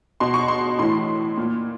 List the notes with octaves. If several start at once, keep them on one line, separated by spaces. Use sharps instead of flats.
B2 C6
C#6
C6
A2 E3 C6
A#2